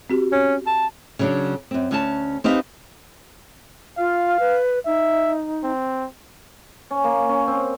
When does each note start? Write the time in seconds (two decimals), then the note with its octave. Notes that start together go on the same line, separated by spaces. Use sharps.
0.10 C4 F#4 G4
0.32 C#4
0.67 A5
1.19 C#3 F#3 D4
1.71 F#2 C4
1.91 D2 C#4 A5
2.44 C4 D#4 G4 B4 F5
3.98 F4 F5
4.39 B4
4.86 D#4 E5
5.64 C4
6.91 C#4
7.04 A#3
7.29 C#4
7.47 C4